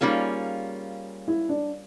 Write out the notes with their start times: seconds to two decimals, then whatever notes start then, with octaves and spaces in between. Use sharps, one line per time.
0.01 G3 A#3 C#4 D#4 F4 G#4
1.28 E4
1.49 D4